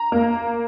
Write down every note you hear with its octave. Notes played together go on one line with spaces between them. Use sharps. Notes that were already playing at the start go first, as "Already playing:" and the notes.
Already playing: A#5
A#3